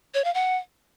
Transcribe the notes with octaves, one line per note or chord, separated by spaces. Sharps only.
C#5
F5
F#5